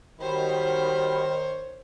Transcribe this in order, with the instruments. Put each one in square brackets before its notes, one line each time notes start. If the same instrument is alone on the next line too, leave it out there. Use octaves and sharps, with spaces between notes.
[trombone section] D#3 [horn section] G3 F#4 B5 [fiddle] C5 C#5